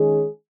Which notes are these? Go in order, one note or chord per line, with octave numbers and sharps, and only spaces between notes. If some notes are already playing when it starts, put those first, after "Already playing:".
Already playing: D#3 G#3 C#4 G#4